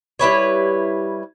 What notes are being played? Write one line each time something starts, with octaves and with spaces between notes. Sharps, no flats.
G3 E4 B4 C#5